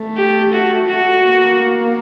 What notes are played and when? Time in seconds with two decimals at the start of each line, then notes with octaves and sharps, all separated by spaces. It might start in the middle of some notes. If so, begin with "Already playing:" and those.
Already playing: A3
0.17 G4
0.53 F#4
0.87 F#4
1.23 A#3